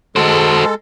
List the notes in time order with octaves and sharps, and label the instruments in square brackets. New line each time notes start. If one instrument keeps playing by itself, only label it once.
[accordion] G#3 A4 [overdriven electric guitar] F#4 C5